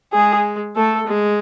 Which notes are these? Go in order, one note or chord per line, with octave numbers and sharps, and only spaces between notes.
G#3 G#4
A3 A4
G#3